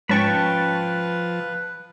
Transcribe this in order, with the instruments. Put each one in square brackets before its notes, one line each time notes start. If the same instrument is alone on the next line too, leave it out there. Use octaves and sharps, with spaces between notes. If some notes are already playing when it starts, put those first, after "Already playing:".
[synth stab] G#2 C#4 C#6 [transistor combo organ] F3 [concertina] B4 [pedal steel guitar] G5 A5 B5